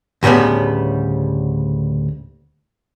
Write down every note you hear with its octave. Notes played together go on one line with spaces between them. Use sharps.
D2 A2 C#3 G3 B3